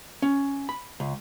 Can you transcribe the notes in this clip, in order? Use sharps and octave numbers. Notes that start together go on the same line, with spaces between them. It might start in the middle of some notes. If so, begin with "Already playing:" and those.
C#4
B5
C#2